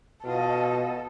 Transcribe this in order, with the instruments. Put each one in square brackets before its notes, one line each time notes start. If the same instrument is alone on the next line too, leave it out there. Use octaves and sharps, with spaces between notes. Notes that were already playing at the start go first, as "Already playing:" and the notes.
[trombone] B2 [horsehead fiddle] F4 D#5 [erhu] A4